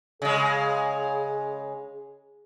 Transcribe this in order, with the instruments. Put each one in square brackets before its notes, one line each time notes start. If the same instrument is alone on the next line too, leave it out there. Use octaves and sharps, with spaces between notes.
[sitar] C#3 G#3 [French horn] G#4